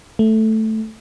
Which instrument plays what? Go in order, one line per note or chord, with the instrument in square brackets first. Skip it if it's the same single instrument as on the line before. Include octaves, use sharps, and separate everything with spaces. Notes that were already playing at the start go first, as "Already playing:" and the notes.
[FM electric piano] A3